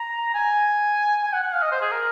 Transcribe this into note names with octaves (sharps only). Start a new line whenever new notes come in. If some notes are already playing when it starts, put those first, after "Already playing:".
Already playing: A#5
G#5
G#5
F#5
F#5
F5
D#5
C5
G#4
A#4